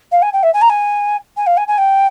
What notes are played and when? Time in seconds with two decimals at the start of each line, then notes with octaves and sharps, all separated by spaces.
0.12 F5
0.22 G#5
0.33 G5
0.43 E5
0.54 G#5
0.61 A#5
0.69 G#5
1.37 G#5
1.46 F5
1.57 G#5
1.68 G#5
1.78 G5